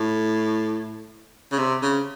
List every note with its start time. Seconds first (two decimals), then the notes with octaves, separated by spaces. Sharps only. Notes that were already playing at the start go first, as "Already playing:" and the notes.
Already playing: A2
1.52 C#3
1.59 C3
1.82 C#3